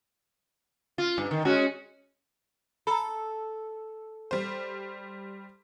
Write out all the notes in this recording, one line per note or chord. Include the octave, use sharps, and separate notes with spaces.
F4
G2
D#3
G#3 C#4 F#4
A4 A#5 B5
G3 C5